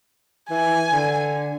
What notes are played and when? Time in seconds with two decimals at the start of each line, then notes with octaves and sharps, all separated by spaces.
0.50 E3 G#5
0.92 D3